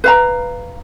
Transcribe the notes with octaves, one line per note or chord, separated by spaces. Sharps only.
B4 F5 A#5